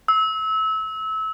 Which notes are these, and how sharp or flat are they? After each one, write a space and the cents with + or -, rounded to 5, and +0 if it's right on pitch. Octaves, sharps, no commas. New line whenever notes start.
E6 -25